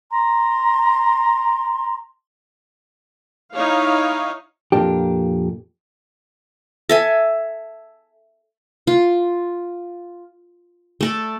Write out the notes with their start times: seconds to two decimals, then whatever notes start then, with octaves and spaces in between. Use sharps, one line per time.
0.12 A#5 C6
3.54 D#4 E4 C#5 F5
4.72 F2 A#2 A#3 D4 G4
6.89 A4 E5 G#5
8.87 F4
11.01 A3 A4 D5